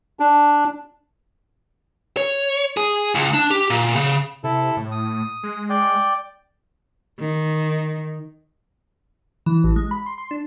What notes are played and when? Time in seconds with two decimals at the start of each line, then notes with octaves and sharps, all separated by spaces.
0.20 D4
2.17 C#5
2.77 G#4
3.15 C#2
3.34 D4
3.51 G4
3.70 A#2
3.96 C#3
4.44 C3 E4 A4
4.77 A2
4.92 D#6
5.43 G#3
5.70 D5 G5
7.19 D#3
9.46 E3
9.64 A1
9.76 G#3
9.91 B5
10.06 C6
10.18 C6
10.31 D4